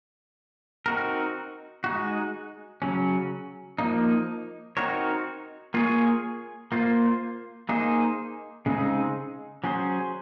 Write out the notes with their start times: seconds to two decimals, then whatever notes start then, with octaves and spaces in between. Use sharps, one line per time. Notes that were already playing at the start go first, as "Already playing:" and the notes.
0.86 C4 D#4 F#4 A#4
1.84 G#3 D#4 F#4
2.82 C#3 F#3 C#4
3.79 F3 A#3 D#4
4.77 C4 D#4 F#4 A#4 C#5
5.74 A#3 F4 G#4 C#5
6.72 A#3 F4 C5
7.69 A#3 D#4 G#4 C5
8.66 C#3 G#3 C4 D#4 G#4
9.64 F#3 C#4 G#4 C5